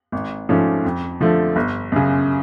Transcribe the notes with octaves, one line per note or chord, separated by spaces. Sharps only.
G#1
G#2 F3 A3 C#4
F2
D3 F3 A3
G1
F#2 C#3